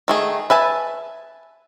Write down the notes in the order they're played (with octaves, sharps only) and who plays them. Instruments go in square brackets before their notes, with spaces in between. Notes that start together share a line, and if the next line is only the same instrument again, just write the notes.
[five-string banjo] D#3 A3 G#4
B4 E5 G#5 A5